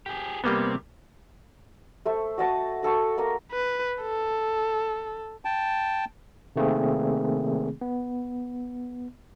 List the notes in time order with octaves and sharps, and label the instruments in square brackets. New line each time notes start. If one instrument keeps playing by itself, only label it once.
[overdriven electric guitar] G4 G#4
[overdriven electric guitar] C3 [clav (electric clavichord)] G3 A#3 B3
[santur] A3 C5 C#6
F#4 D#5 A5 D#6
F#4 A4 A5 C#6
A#3 D#5 A#5
[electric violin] B4
A4
[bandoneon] G5 A5
[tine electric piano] C3 D#3 A3 A#3 C4 G#4
B3